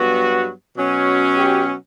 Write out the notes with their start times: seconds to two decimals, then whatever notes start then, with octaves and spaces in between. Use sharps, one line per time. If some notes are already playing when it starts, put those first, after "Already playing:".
Already playing: G2 F#3 B3 F#4
0.76 B2 F#3 C#4
1.36 G4